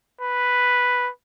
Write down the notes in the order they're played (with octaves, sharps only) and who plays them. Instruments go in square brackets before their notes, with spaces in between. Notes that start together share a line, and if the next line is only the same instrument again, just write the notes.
[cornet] B4